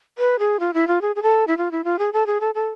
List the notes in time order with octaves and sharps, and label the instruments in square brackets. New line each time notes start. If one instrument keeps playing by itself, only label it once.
[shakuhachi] B4
G#4
F4
E4
F4
G#4
G#4
A4
E4
F4
E4
F4
G#4
A4
G#4
A4
A4